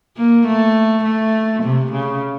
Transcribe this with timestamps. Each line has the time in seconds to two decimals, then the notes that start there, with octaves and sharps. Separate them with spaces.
0.17 A#3
0.47 A3
1.04 A3
1.63 C3
1.92 C#3